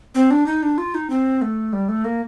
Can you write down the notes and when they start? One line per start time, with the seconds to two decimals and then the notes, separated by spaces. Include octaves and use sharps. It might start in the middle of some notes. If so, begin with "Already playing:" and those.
0.15 C4
0.31 D4
0.46 D#4
0.63 D4
0.78 F4
0.95 D#4
1.10 C4
1.42 A3
1.73 G3
1.89 A3
2.04 A#3